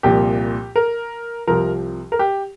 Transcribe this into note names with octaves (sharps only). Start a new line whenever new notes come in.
C2 A#2 F3 G4
A#4
C2 C3 F3 A#4
A#4
G4